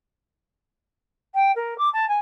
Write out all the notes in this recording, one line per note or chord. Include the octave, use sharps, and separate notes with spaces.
G5
A#4
D6
A5
G#5